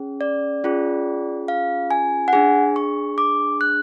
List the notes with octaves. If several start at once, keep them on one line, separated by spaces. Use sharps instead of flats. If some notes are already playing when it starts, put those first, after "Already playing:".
Already playing: C#4 G#4
D5
C#4 F4 G#4
F5
G#5
F#5
D4 G#4 G#5
C#6
D6
F#6